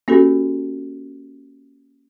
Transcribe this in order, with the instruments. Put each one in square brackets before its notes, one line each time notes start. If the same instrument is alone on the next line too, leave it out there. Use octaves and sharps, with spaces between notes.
[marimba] A#3 C#4 F#4 G4 A4